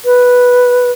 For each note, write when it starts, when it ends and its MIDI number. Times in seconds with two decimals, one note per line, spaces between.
0.05 0.91 71